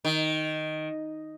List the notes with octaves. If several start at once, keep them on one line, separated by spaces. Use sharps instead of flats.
D#3